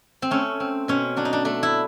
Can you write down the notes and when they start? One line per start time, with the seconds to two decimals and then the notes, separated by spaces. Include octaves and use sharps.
0.22 C4
0.31 A3 C#4
0.60 C4
0.88 B2 C#4
1.17 F#3 D4
1.25 D#4
1.33 D4
1.45 A3 D4
1.63 E4